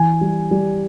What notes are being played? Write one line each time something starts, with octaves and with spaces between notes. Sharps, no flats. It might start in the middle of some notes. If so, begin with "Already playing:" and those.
Already playing: E3 G#5
G3
G3